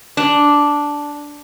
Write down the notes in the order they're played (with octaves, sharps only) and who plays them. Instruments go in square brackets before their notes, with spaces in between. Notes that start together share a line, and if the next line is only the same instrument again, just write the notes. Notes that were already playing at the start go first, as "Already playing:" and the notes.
[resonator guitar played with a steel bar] D4